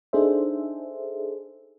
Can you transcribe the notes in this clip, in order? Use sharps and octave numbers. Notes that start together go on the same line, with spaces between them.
D4 D#4 G#4 A4 C5 E5